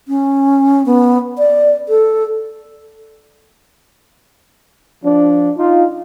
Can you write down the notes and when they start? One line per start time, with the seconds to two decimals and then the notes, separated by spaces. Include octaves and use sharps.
0.08 C#4
0.86 B3
1.38 D5
1.89 A4
5.03 F3 D4
5.57 D#4 F4